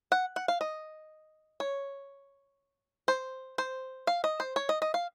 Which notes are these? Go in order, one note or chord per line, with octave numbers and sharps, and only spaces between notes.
F#5
F#5
F5
D#5
C#5
C5
C5
F5
D#5
C5
C#5
D#5
D#5
F5